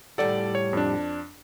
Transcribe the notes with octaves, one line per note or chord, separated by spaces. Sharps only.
A2 G3 A4 D5 F#5
C#5
F2 D4